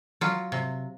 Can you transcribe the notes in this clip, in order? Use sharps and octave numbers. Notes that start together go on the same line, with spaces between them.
F#3 F4
C3